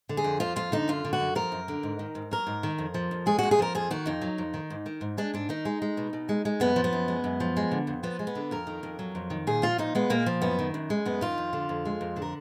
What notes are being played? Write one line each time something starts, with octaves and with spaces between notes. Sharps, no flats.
D3
G#4
F2
F3 F4
F2 F4
D3 D#4
F#2 F4
D3
F#4
F#2
F3 A#4
F#2
D3
G#2
D#3
G#2
F#3 A#4
G#2
D#3
F2
F3
F2
G#3 G#4
F2 F#4
G#4
F3 A#4
F2 G#4
D#3 F#4
F2 D#4
F#3
F2
D#3
G#2
D#3
G#2
G#3 D4
G#2 D4
D#3 D#4
G#3
G#3
B2
B2
G#3
G#3
F#2 B3
F3
B3
F#2
G#3
F#2
F3
G#3
D3
F2
F3 B3
G#3
B3
D3
F2 A#4
D#3
F2
F#3
F2
D#3
A#2 G#4
F3 F4
A#2 D#4
G#3 B3
A#2 A#3
F3
F#2 B3
D#3
F#2
G#3
F#2 B3
D#3 F4
F2
D3
F2
G#3
F2
D3
A#4